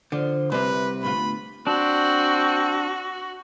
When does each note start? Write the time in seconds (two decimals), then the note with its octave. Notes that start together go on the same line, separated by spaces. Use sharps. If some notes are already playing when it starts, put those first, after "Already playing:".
0.12 D3 F3
0.52 C2 C3 B4 C5
1.03 D2 B3 F4 B5
1.67 C4 D4 F#4